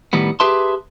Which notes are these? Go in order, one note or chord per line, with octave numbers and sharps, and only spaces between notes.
A2 D#3 G3 B3
G4 G#4 B4 E5 A5 C6